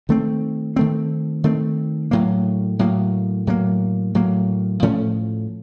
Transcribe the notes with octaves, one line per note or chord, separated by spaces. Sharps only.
D#3 A3 C4
D#3 A3 C4
D#3 A3 C4
A2 F#3 A#3
A2 F#3 A#3
A2 F#3 A#3
A2 F#3 A#3
A2 F3 A3 C#4